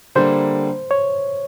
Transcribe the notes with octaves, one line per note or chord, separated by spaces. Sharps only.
D3 G3 A#3 C5
C#5